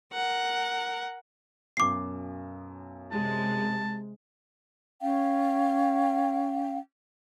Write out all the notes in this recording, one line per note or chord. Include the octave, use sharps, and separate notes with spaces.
A#4 F#5
B1 F#2 D6 C7
C3 G#3 A5
C#4 F5 G5